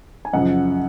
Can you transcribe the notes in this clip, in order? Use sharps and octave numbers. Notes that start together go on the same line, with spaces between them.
G#5
F#2 C#3 F3 D#5 F#5